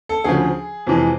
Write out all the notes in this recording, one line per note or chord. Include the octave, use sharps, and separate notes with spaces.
A4
D2 C#3 F3 G#4
F2 C3 E3 G#3